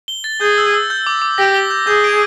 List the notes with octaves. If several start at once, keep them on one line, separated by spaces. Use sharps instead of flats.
G7
A6
G#4 G6
E6
E6
G6
D6
D6
G4 A#6
G7
G6
G#4 G6
D7